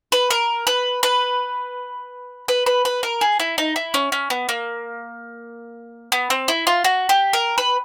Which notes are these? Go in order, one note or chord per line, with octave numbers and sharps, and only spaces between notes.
B4
A#4
B4
B4
B4
B4
B4
A#4
G#4
E4
D#4
E4
C#4
C#4
B3
A#3
B3
C4
E4
F4
F#4
G4
A#4
B4